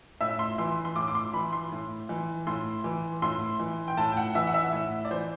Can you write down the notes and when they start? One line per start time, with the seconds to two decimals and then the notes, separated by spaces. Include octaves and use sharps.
0.21 A2 E5
0.39 C6
0.58 E3 C6
0.85 C6
0.96 A2 D6
1.08 D6
1.15 C6
1.33 E3 B5
1.53 C6
1.72 A2
2.09 E3
2.47 A2 C6
2.84 E3
3.22 A2 C6
3.60 E3
3.88 G5
3.97 A2 A5
4.12 G5
4.17 F#5
4.35 E3 E5
4.47 F#5
4.54 E5
4.73 A2
5.05 D5
5.11 E3 C5